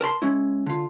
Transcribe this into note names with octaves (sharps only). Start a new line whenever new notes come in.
A#4 A5 B5 C6
G#3 C#4 E4
D3 F4